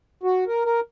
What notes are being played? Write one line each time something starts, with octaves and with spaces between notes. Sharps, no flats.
F#4
A#4
A#4